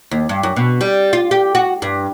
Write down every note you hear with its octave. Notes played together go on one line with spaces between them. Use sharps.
D#2
G2
F#2
B2
G3
F4
G4
F#4
G2